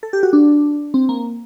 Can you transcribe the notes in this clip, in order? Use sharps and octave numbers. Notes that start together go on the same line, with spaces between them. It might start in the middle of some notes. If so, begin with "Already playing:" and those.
A4
G4
F#4
D4
C4
A#3